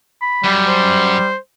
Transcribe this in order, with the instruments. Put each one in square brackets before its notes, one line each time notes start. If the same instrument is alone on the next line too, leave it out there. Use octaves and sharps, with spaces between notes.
[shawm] B5
[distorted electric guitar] F#2 [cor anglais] G3
[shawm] C5